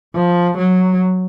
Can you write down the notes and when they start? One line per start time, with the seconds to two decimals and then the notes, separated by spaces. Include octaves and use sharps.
0.15 F3
0.58 F#3